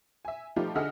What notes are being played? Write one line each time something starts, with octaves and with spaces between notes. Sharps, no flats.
E5 G#5
F3 G3 A3 D#4 F4 G4
D3 G#4 D#5 E5 F#5 F6